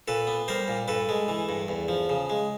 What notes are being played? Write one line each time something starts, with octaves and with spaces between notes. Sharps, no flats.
A#2 A4 B4
B3
G3 A#4 C5
A#2
G2 A4 B4
G#3
E3
G2
E2
F3
C#3
G#3